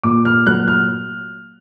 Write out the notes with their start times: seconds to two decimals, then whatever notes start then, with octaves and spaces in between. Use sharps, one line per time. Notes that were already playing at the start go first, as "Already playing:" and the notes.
0.03 A#2 D6
0.25 F6
0.47 F#3 F#6
0.68 F6